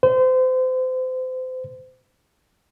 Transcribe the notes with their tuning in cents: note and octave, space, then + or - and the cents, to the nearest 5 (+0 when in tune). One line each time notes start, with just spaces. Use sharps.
C5 -30